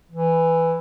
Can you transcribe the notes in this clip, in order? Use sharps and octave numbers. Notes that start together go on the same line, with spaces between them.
E3